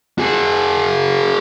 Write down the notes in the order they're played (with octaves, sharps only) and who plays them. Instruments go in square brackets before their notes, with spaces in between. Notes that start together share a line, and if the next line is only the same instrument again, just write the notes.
[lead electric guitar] F#4 G#4